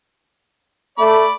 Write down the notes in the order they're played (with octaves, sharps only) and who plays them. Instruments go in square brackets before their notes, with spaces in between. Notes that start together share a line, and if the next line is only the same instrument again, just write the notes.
[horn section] A3 [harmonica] D5 B5 D6